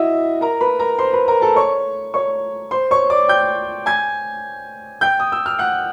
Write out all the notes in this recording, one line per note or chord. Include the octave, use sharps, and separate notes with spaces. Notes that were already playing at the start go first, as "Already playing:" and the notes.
Already playing: E4 F#4 D#5 E5
A#4 A#5
B4 B5
A#4 A#5
C5 C6
B4 B5
A#4 A#5
A4 A5
C#5 C#6
C#5 C#6
C5 C6
C#5 C#6
D5 D6
G5 G6
G#5 G#6
G5 G6
D#6
E6
F6
F#5 F#6